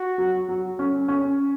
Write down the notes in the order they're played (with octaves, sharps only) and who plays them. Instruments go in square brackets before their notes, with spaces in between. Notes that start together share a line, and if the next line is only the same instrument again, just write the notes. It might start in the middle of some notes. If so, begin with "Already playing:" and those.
Already playing: [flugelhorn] F#4
[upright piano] F#3
F#3
C#4
C#4